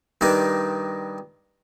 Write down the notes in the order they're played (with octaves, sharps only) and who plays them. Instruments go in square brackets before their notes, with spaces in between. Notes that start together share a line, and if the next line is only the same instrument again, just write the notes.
[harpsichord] G2 D#3 D4 D#4